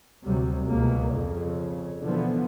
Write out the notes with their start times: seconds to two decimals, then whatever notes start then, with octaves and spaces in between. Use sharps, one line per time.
0.23 D2 C3 F#3 G3
0.69 C#2 B2 A#3
1.12 F2 C#3
2.03 B2 D3 E3 F3 B3